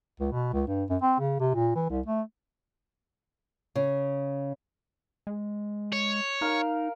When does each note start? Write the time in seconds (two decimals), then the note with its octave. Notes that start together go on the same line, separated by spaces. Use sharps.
0.20 C#2
0.32 B2
0.53 C#2
0.67 G2
0.90 F#2
1.02 C4
1.20 C#3
1.40 C3
1.54 A#2
1.75 E3
1.90 C2
2.06 A3
3.76 C#3
5.27 G#3
5.93 C#5
6.41 D#4 A#4 F5